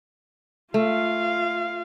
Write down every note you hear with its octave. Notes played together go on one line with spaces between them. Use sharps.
A3 F4 F5